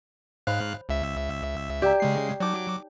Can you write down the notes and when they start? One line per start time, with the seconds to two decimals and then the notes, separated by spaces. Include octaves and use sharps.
0.47 G#2 C5 C#5 F5 B5 F#6
0.89 C#2 E5
1.82 G4 D5 F5 A#5
2.00 C#3 G#3 C7
2.40 F#3 D#4 C#5 D6